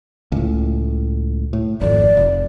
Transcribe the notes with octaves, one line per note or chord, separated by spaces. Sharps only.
C#2 A2
A2
G#1 F2 D5
F1